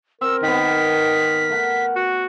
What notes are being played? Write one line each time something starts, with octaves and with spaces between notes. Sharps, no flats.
C4 A#4 E6
D#3 B3 G5 B6
A3 F#5
F#4